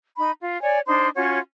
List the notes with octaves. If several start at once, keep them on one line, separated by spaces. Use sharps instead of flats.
D#4 B5
F4
C#5 D5 G#5
D4 D#4 C5 C6
C#4 F4 F#4 C#5